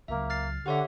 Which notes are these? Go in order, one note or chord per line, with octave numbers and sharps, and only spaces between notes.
C#2 F#3 A#3 E5
F6 A6 C7
D3 G4 C#5 E5 F#5